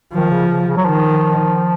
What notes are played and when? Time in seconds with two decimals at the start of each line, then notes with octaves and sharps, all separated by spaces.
0.14 D#3 F3
0.31 C#3
0.49 C#3
0.67 C#3
0.77 F#3
0.85 D#3 F3